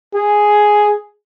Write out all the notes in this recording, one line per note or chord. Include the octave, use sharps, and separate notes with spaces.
G#4